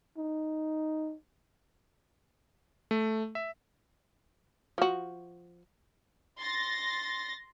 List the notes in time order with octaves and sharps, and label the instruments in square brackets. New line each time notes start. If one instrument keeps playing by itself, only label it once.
[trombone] D#4
[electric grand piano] A3
E5
[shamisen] F3 F#4
[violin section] C6 A6 A#6